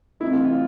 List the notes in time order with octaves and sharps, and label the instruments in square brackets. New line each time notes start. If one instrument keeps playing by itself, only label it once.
[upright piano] C3 E3 A3 C4 D#4 [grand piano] E4
[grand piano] F4
F4